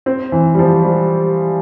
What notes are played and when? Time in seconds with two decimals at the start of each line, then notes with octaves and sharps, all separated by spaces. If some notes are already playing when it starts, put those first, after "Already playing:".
0.06 C4
0.32 E3
0.54 G3
0.59 F3
0.84 G3